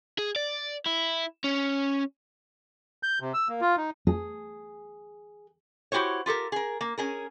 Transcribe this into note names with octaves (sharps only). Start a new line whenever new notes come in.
G#4
D5
E4
C#4
G6
C3
E6
A#3
F4
D#4
G#4
E4 F#4 G4 C5 C#5
F4 G4 A4 A#4
G#4 A#4
A#3
C#4 G#4 A#4